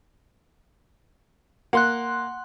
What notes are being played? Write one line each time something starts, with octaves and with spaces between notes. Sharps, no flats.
A#3 F#5 C6 F#6